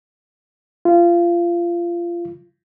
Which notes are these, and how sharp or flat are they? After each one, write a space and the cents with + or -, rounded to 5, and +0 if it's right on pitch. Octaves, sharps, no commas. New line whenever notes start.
F4 -20